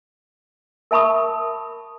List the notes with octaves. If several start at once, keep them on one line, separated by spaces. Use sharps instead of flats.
A#4 E5 A5 B5 C#6 D#6